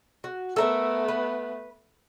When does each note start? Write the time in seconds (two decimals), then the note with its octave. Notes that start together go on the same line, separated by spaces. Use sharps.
0.24 F#4
0.56 A3 B3 A4 A#4 E5
1.08 B4